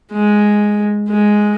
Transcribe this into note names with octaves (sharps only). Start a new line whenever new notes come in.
G#3
G#3